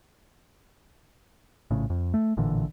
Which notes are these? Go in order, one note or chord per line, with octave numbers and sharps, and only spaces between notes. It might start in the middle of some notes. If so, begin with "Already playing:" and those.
A#1 A2 C#3
F2
A3
A1 A#2 D3 E3